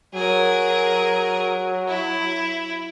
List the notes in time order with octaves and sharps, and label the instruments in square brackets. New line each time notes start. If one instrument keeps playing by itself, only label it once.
[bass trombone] F#3 [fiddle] G#4 A#4
[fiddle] E4